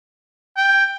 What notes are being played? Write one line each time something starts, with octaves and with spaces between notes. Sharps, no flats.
G5